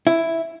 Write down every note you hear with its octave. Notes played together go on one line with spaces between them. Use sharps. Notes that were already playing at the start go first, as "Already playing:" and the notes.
E4